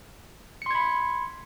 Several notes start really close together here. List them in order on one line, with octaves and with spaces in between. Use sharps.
C#7 C6 G#6 B5